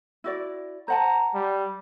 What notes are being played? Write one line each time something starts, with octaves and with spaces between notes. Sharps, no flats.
E4 F#4 D5
C5 F#5 A5 A#5
G3